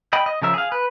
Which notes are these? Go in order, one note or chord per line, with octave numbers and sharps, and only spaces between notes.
D#5 G5 B5
D#5
C#3 F3 A#4 E5
G#4 F5
B4